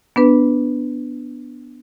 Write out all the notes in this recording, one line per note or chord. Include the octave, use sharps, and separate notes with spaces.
B3 D4 B4